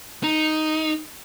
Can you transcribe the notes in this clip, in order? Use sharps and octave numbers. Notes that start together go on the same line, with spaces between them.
D#4